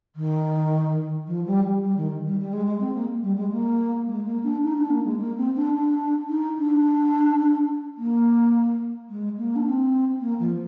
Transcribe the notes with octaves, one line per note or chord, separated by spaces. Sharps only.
D#3
F3
G3
G3
D#3
G3
G3
G#3
G#3
C4
A#3
G3
G#3
A#3
G#3
A#3
D4
D#4
D4
A#3
G#3
A#3
C4
D4
D4
D#4
D4
A#3
G#3
A#3
D4
C4
A#3
F3